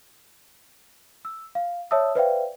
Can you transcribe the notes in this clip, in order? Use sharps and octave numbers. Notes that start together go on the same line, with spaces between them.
E6
F5
C#5 D5 E5 A5 D#6 E6
B4 C5 D5 E5 F5 G5